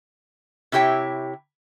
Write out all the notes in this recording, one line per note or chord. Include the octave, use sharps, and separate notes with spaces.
C3 E4 G4 C#5 G5